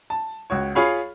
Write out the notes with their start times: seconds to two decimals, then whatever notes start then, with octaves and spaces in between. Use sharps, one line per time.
0.10 A5
0.50 C#2 F#4 C#5
0.75 F4 G#4 C#5 F5 B5